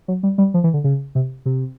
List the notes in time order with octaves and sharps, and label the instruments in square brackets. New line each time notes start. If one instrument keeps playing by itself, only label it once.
[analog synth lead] F#3
G3
G3
F3
E3
D3
C#3
C3
C3